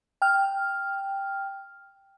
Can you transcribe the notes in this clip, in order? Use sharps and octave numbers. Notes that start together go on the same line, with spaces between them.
G5 F6